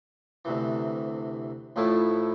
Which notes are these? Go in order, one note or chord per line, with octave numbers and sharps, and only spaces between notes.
D2 C3 E3
A1 A2 F3 A3 E4